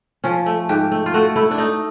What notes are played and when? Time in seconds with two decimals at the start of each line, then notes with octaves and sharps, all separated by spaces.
0.24 F3 C#4
0.46 A3
0.69 G#2 G4
0.92 A3
1.06 F4
1.14 A3 F#4
1.36 A3 E4
1.51 D4
1.58 A3 D#4